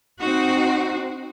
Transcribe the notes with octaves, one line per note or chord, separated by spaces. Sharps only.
C4 D#4 F#4